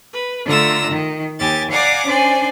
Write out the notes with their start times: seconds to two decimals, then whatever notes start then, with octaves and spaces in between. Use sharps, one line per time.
0.13 B4
0.47 D3 A3 F4 A#5 E6
0.91 D#3
1.39 D#2 G4 G#5 A6
1.71 D5 F5 F#5 G#5 A#5 D6
2.07 C#4 D4 C5 D5 G#5